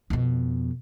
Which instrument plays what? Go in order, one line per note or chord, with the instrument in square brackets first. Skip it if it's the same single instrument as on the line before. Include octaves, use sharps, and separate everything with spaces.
[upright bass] F2 B2